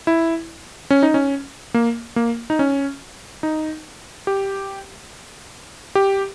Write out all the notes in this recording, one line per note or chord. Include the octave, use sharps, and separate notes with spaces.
E4
C#4
D#4
C#4
A#3
A#3
D#4
C#4
D#4
G4
G4